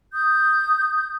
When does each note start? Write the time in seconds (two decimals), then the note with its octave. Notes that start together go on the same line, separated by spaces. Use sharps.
0.13 D#6 G6